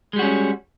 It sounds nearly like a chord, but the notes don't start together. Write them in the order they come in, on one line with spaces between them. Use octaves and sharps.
G#3 G3 F#4 C#4